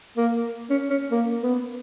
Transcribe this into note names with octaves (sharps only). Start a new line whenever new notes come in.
A#3
C#4
C#4
A#3
B3